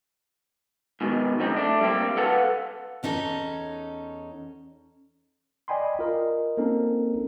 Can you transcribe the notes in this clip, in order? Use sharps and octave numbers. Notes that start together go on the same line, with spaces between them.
G#2 B2 D#3
F#2 A2 C#3 C4 D#4
A3 D4
G3 A#3 C4
A4 B4 F5 F#5 A5
E2 C#4 D#4 A4
D5 D#5 G5 G#5 B5 C6
F4 A#4 D#5
A#3 C4 C#4 D#4 A4 A#4